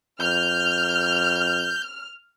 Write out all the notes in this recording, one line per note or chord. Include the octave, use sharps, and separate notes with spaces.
F2 F6 G6